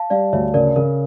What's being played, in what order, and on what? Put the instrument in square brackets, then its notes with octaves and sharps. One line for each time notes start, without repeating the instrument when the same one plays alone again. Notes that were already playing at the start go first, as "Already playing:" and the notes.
Already playing: [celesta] F5 A5
[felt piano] G3 [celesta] D5 F5
[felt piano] D2 [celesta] C#5 E5
[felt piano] C#3 [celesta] A#4 D5
[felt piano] C#3 [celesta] A#4